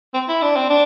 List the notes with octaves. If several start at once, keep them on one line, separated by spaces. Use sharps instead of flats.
C4
E4
D4
C4
D4